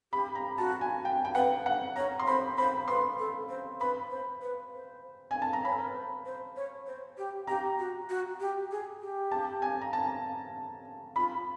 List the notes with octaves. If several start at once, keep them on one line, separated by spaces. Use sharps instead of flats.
G4 B5
A#5
F#4 A5
G#5
G5
G5
B4 F#5
F#5
C#5 A#5
C6
C5 B5
C5 B5
B4 C6
A4
C5
B4 B5
C5
B4
C5
G#5
A5
A#5
C#5 B5
A4
A#4
B4
C5
C5
C#5
C5
G4
G4 A#5
F#4
F#4
G4
G#4
G4
A5
G#5
A#5
A5
F4 B5